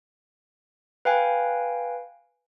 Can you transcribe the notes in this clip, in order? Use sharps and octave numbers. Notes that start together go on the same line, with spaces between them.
B4 F5 G5 G#5